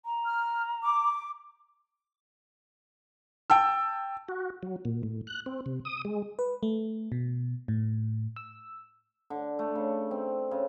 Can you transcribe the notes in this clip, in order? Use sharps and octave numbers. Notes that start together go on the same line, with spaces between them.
A#5
F6
D6
G5 A5 E6
F#4
F#3
A#2
A2
F#6
C4
C3
D#6
G#3
B4
A3
B2
A2
E6
D3
A3
C#3
C4
C#3